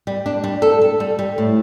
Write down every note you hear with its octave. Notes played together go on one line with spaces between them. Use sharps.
G3
D4
G3
A4
A4
G3
G3
A2